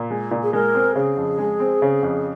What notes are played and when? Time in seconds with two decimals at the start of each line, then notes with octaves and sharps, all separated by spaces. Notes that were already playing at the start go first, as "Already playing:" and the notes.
Already playing: A#2
0.10 G#3
0.31 A#2
0.43 G#4
0.53 G#3 A#4
0.75 C4
0.95 C#3 G#4
1.17 F2
1.38 G#3
1.60 C4
1.82 C#3
2.03 F2